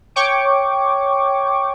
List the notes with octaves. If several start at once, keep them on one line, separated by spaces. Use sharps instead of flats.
C#5 G5 C#6 D6